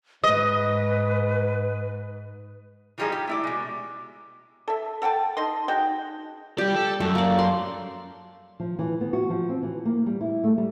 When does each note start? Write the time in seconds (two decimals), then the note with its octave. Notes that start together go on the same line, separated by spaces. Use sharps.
0.24 G#2 B4 D#5
2.98 E3 F3 G3 D#4 G#4 D#5
3.12 G4
3.27 A3 E4 D5
3.44 B2 G#3
4.68 A4 E5
5.02 A4 F#5 G5 A5
5.37 D#4 D#5 C6
5.68 G#3 D#4 F#4 G5
6.58 G3 G4 D5
6.75 A4
7.00 F#2 A3
7.15 A#3 D5
7.39 C6
8.60 F3
8.79 E3
9.01 B3
9.13 F#4
9.30 F3
9.49 C4
9.62 E3
9.85 A#3
10.06 G3
10.21 E4
10.44 A3
10.58 G3